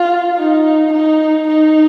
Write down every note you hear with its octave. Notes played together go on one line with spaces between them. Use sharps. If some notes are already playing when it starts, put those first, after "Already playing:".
Already playing: F4
D#4
D#4
D#4